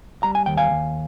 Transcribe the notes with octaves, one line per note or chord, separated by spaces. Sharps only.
G3 A#5
G#5
D#2 G5
F5 G#5
D#2